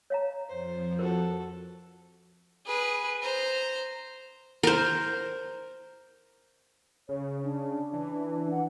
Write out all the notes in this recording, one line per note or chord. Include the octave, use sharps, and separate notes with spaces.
C#5 F5 A#5
F2 F3 C5
F#4 A4 A#4 C5
G#4 B4
C5 A#5
A#4 C5
C#3 C#5
D4
E3
F#5